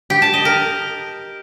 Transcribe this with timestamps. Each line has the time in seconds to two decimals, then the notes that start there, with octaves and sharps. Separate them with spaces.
0.10 G4
0.22 A5
0.34 D#5
0.45 A#4